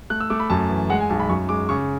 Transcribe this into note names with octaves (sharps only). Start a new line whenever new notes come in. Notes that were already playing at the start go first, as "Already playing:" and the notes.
A3 F#6
E6
A3 D6
B5
F#2 A5
E3
G#3 F#5
G#5
B1 A5
B5
F#2 C#6
G#3 D6
C#3 C#6